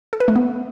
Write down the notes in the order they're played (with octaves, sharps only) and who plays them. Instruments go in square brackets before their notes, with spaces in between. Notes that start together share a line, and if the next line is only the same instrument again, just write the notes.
[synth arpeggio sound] A4
B4
A3
B3